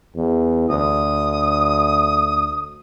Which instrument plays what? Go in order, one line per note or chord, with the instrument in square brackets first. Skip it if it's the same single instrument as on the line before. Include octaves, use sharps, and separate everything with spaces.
[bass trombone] E2
[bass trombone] D2 [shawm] D#6